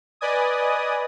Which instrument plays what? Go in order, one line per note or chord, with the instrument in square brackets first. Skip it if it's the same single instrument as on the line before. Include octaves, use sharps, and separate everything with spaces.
[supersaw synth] B4 D5 D#5 G#5 D#6